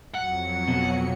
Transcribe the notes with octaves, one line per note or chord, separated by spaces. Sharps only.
F2 F#3 F#5 C#7
B2